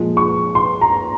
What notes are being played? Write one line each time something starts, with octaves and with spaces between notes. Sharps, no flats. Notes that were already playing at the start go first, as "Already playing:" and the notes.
Already playing: A#2 F3 G#3
C#6
C6
A#5